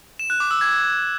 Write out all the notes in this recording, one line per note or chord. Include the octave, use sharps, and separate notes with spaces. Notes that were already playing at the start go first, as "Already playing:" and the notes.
E7
F#6
D6
E6
G#6